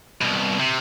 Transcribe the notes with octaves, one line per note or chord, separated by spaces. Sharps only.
C2 B2
C3